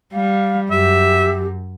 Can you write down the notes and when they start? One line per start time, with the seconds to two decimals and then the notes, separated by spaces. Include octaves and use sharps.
0.13 G3 F5
0.71 F#2 G4 E5